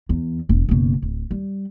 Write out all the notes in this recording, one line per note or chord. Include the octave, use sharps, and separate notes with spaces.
E2
E1
F#1 B2
D1
G3